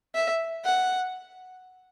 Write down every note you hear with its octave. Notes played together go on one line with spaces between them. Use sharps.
E5
F#5